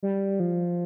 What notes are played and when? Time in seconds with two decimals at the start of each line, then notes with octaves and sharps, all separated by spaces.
0.03 G3
0.40 F3